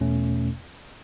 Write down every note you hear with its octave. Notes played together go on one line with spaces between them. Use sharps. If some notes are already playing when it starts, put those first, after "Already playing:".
E2 B2 A3 C#4